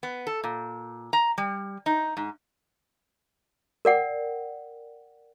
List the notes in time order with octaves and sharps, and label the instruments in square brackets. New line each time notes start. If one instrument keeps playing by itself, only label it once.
[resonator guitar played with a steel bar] B3
A4
A#2
A#5
G3
D#4
G#2
[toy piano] A#4 D5 F#5 G5